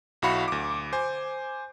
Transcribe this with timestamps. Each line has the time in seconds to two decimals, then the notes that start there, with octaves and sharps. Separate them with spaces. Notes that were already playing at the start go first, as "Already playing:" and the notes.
0.22 B1 E4 F#4 F5 B5 C#7
0.48 D2 D6
0.93 C5 G#5